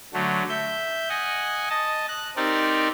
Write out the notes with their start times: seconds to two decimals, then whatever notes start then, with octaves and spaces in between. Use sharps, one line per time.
0.14 D3 F#3 A3
0.49 E5 G6
1.09 D#5 F#5 G#5
1.70 D#5 A5
2.08 F#6
2.37 C4 D#4 G4 A#4 D5